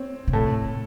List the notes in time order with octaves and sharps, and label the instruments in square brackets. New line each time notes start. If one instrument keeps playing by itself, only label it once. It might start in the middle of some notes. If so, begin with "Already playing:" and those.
Already playing: [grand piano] C4 C#5
[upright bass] C3
[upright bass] A2 [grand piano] A3 A4